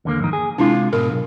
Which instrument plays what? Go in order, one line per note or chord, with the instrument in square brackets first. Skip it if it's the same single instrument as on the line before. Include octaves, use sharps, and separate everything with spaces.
[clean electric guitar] D#2 D3 A#3
F2 G#2 D#3
G#4
[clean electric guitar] C3 G#3 F4 [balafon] D4 E4
[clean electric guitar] G#2 B2 [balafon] A#4
[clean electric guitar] B1